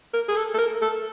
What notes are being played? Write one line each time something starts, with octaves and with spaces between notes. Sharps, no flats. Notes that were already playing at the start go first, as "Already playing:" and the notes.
A#4
G#4
A4
A4
A#4
A4